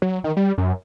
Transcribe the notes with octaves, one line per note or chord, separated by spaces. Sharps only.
F#3
D#3
G3
F#2